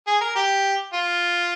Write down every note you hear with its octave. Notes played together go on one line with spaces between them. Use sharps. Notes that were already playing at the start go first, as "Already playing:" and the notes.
G#4
A#4
G4
F4